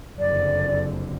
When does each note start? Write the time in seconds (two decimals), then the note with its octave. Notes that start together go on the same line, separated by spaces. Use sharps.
0.18 F#1 F2 D3 D5